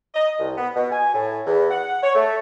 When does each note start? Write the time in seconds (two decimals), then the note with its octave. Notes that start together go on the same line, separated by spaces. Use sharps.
0.15 D#5
0.39 C2
0.57 B3
0.76 B2
0.92 G#5
1.14 A2
1.46 E2
1.71 F#5
2.03 C#5
2.15 A3